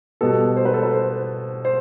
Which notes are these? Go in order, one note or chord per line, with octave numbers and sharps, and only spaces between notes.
B2 G3 B3 A4
C5
B4
A4
B4
C5
C5